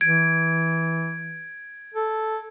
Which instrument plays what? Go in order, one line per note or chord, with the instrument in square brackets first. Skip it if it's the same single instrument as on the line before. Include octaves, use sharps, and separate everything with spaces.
[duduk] E3 [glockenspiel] G#6 D7
[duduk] A4